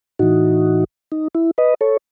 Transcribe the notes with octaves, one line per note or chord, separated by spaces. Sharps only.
A2 E3 D#4 F#4
D#4
E4
B4 D#5
A4 C#5